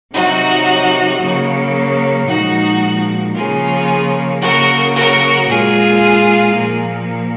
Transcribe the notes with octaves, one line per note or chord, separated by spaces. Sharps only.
C3 D#3 F#3 D#4 F#4
C#3 F#3 A#3
A#2 F3 G#3 D#4 F#4
C#3 F3 A#3 F4 G#4
C#3 F#3 A#3 F#4 A#4
F#4 A#4
A#2 G#3 F4 G#4
A#2 F3 A#3